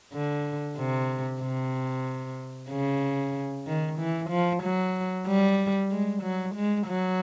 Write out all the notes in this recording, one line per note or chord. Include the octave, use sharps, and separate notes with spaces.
D3
C3
C3
C#3
D#3
E3
F3
F#3
G3
G#3
F#3
G#3
F#3